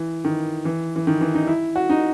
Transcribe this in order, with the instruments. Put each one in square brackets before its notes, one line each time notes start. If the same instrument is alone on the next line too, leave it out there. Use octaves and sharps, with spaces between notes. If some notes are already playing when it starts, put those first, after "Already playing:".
Already playing: [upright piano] E3
D#3
E3
E3
D#3
E3
D#4
E4
F#4
D#4